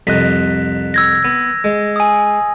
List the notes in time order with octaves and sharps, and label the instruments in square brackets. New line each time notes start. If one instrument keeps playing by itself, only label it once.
[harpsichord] C2 F2 D#5 [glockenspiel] F#6 B6
[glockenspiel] E6 G#6 A#6
[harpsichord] B3
G#3
[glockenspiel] G#5 D#6